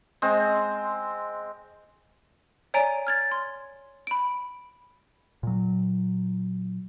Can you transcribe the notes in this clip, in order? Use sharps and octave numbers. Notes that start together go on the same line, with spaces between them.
G#3 C4
C#5 D5 G#5 A#5 D7
F6 G#6 A6
C6
B5 D7
A#2 F#3